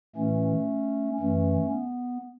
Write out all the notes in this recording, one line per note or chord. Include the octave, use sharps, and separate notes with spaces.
A2 E3 A3 C#4
F#2 E3 A3 C#4
B3